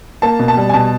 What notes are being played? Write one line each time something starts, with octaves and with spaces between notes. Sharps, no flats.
A#3 A5
B2
A5
G3
G#5
B2 A5